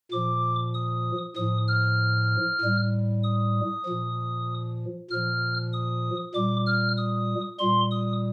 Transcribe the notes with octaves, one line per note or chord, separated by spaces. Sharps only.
A#2 F3 D6
D#6
A2 F3 D#6
F6
A2 G3
D#6
A#2 F3
A#2 F3 F6
D#6
A#2 G3 D6
F6
D#6
A#2 G3 C6
D#6